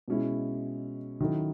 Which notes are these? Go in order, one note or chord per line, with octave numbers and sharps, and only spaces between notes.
B2 G#3 C#4 E4
D#3 F#3 C#4 E4 A4